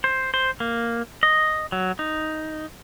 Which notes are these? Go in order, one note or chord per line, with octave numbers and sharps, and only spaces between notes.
C5
C5
A#3
D#5
F#3
D#4